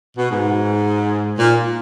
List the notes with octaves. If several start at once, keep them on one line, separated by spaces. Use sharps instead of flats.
B2
G#2
A#2